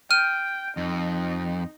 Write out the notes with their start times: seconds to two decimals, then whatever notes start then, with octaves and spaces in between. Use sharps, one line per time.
0.11 G5 F6 D#7
0.77 F2 D#4